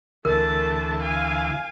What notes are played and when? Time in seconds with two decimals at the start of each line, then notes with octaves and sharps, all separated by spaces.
0.25 D2 E3 A3 A#4 A5
1.02 F5 G#5